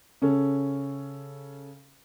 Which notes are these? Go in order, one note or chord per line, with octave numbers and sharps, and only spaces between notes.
C#3 C#4 A4